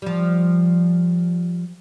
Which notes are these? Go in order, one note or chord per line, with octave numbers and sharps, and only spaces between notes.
F3 G3